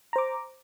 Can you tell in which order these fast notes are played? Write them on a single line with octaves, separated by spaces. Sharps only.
A#5 C5 D6